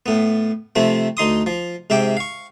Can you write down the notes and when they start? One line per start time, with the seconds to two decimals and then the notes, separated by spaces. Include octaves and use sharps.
0.06 A2 B3
0.76 C3 F3 A3 C4
1.17 D2 D#4 C6 D#6
1.46 F3
1.90 G#2 C3 E5 G5 D6
2.17 F5 C#6